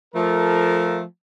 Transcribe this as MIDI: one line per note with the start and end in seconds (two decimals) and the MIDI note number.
0.15 1.02 53
0.15 1.02 57
0.15 1.02 70